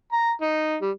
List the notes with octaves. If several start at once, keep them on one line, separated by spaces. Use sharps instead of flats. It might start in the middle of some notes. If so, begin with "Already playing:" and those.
A#5
D#4
G3